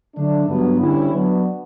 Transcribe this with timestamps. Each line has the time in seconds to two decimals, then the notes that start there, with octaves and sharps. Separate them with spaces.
0.15 D3 F#3 A3 D4
0.48 G2 F#3 B3
0.80 D2 D3 G3 C#4 E4
1.13 F#3 B3 D4 F#4